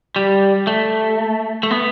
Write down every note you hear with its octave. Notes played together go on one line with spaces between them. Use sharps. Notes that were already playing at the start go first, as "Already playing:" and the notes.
G3
A3
A3
B3